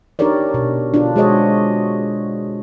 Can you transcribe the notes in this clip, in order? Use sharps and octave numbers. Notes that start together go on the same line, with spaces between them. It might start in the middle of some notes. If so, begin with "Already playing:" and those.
D4 D#4 G4 A#4 C#5 D5
B2
D4 F4
G#3 F#4 G#4 C5 C#5 D#5